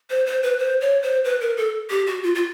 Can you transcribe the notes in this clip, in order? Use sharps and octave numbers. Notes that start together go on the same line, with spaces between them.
C5
C5
B4
C5
C#5
C5
B4
A#4
A4
G4
F#4
F4
F4